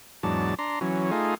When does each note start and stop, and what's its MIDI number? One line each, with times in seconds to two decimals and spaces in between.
0.23 0.55 40
0.23 0.55 44
0.23 0.55 54
0.23 0.55 62
0.23 0.55 81
0.59 0.79 62
0.59 0.79 82
0.59 0.79 84
0.81 1.11 52
0.81 1.11 54
0.81 1.11 61
1.11 1.35 57
1.11 1.35 63
1.11 1.35 65
1.11 1.35 68